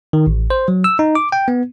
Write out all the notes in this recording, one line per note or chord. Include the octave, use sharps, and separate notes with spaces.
D#3
A1
C5
F#3
E6
D#4
D6
G5
B3